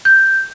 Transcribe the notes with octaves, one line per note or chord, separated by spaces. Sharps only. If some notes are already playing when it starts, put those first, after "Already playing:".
G6